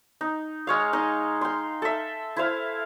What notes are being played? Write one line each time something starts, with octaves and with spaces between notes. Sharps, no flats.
D#4
G#3 C#5 F5
D#4 D#5
G5 C6
A4 E5
E4 C5 F5